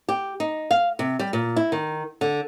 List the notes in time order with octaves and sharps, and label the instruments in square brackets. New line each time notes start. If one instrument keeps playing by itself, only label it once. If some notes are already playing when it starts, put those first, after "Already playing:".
[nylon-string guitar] G4
D#4
F5
C3
G3
A#2
E4
D#3
D3